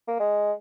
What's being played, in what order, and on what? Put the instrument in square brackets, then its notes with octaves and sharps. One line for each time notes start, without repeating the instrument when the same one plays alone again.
[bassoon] A#3
G#3